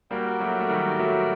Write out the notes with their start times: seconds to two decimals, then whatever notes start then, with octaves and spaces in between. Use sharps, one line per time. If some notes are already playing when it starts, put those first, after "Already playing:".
0.11 G3 A#3 F#4 A#4 D5 G5
0.40 F#3 A3
0.60 A3
0.70 D#3 G3
0.99 F#3 A3